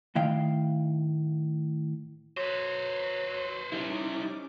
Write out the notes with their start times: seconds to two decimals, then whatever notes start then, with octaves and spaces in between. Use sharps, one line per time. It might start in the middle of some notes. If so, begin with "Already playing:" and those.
0.15 A2 D#3 F5 G5
2.37 F#3 B4 C5
3.72 G3 C#4 D#4 E4 D6